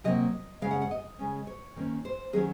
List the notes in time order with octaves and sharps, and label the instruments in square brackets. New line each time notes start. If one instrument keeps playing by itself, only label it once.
[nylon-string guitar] C3 F#3 A#3 D#5
C#3 G#3 C#4 F5
F#5
F#5
D#5
C#3 G#3 C#4
C#5
D#3 A#3 C#4
C5
D#3 F#3 C#4 G#4